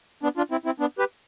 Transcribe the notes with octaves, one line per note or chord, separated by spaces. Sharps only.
B3 D4
D4 F4
C4 E4
C4 E4
B3 D4
G4 B4